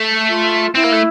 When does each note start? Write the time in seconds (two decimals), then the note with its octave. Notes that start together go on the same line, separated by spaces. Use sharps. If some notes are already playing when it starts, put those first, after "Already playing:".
Already playing: A3
0.29 F4
0.75 C4 E4
0.84 A#3
0.93 A3